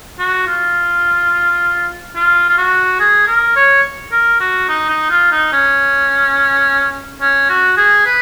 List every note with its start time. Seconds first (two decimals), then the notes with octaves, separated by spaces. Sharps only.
0.19 F#4
0.47 F4
2.16 F4
2.49 F4
2.58 F#4
3.00 G#4
3.27 A#4
3.56 C#5
4.12 A#4
4.40 F#4
4.68 D#4
4.89 D#4
5.10 F4
5.32 D#4
5.53 C#4
7.20 C#4
7.49 F#4
7.77 G#4
8.06 B4